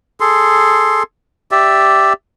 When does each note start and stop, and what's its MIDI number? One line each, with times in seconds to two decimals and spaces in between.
0.20 1.03 68
0.20 1.03 69
0.20 1.03 84
1.51 2.13 67
1.51 2.13 74
1.51 2.13 76